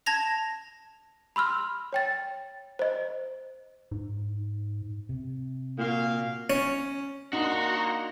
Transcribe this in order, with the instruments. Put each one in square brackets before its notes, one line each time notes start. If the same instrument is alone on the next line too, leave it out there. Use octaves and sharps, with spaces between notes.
[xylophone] A5 G#6 A#6 F7
B5 C6 E6 F6
C#5 G5 A6
C5 D#5
[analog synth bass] G#2
[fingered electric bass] C3
[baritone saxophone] A#2 [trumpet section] F#4 F5
[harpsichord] C#4
[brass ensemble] A#3 [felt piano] D4 D#4 [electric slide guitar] F#4 [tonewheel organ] F#5 A#5 C6